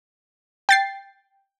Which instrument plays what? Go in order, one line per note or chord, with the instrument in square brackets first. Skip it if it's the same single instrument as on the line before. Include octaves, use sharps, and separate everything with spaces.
[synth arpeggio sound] G5 A6 C7